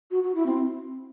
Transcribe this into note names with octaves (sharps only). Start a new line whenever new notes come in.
F#4
F#4
E4
C4